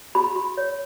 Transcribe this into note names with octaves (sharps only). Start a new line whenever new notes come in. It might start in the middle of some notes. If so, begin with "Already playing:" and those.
F#4 B5
F#4
C#5